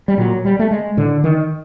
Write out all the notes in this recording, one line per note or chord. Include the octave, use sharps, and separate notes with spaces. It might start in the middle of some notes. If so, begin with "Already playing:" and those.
G3
A#2 F#3
G3
A3
G#3
A2 D3
D#3